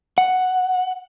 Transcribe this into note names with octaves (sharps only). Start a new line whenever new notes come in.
F#5